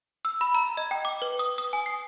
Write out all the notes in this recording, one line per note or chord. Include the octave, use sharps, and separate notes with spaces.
E6
B5
A#5
D#5
G5
D6
B4
D#6
D#6
G#5
C7